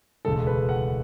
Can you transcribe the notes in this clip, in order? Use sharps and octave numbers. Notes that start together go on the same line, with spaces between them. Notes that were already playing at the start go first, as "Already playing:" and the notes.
E1 D2 C#3 G#3 A4
B4
F#5